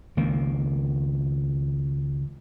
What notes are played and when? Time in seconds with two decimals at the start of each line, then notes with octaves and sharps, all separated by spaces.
0.17 C#2 D#3 A#3